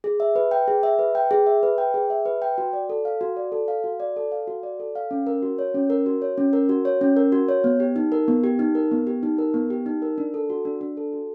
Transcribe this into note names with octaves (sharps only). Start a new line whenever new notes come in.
G#4
E5
B4
G5
G#4
E5
B4
G5
G#4
E5
B4
G5
G#4
E5
B4
G5
F#4
D5
A4
F5
F#4
D5
A4
F5
F#4
D5
A4
F5
F#4
D5
A4
F5
C#4
A#4
F#4
C#5
C#4
A#4
F#4
C#5
C#4
A#4
F#4
C#5
C#4
A#4
F#4
C#5
B3
G4
D#4
A#4
B3
G4
D#4
A#4
B3
G4
D#4
A#4
B3
G4
D#4
A#4
D4
A4
F#4
D4
D4
A4
F#4